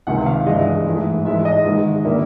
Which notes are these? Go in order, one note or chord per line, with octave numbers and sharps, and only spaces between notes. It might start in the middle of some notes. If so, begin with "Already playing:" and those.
C#2 C3 D#3 F#5
F5
G2 E3 G#3 D#5
G#2 E3 A3
G#2 E3 G#3 E5
D#5
G#2 D#3 G#3
D3 G3 A#3 E5